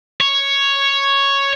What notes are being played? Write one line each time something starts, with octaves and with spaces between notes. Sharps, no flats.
C#5